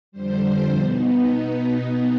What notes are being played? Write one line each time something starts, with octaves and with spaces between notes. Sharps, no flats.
F2 D3 G3 C5
B2 B3 D#4